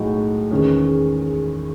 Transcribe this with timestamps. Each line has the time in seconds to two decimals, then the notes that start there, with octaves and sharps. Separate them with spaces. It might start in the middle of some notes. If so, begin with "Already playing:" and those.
Already playing: B1 A2 G#3 D#4 F#4
0.51 E2 D#3 G#3 C#4